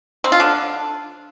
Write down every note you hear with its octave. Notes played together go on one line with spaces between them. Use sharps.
C4
F4
D3